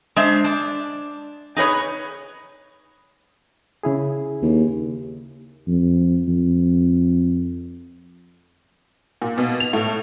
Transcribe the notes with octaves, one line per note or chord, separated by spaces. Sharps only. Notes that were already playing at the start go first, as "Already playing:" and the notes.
G#3 D4 C5 E5
D4
D#4 G#4 B4 C#5
C#3 E4 G#4
D#2
F2
F2
A#2
B2
F7
A2